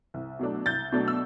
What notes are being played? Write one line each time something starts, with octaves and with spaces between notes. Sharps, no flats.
C2
B2 F#3 A3 D4
C2 G6 A6
B2 F#3 A3 D4
E6